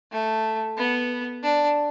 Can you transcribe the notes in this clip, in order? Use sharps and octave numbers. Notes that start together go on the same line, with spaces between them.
A3
B3
D4